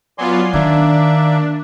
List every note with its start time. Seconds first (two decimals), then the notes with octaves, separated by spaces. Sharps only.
0.18 F#3 B3 F4 D5 G#5 C6
0.53 D#3 A#3 D4 D5 E5